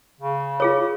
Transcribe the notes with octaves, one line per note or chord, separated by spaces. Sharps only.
C#3
F4 G#4 C#5